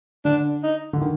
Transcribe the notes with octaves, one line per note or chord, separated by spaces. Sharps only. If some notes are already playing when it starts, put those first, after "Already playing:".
D3 D4
D#4
D3
D#3